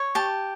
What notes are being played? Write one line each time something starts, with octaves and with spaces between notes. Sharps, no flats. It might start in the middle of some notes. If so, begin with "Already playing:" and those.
Already playing: C#5
G4 A5